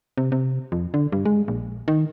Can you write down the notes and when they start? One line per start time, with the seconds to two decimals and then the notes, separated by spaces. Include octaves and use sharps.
0.18 C3
0.32 C3
0.72 F2
0.94 D3
1.12 G2
1.26 G#3
1.48 A#1
1.88 D#3